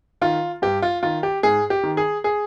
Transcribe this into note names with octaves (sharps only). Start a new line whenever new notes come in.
D#3 F4
G2 G4
F4
D#3 F4
G4
G#2 G#4
G4
D#3
G#4
G#4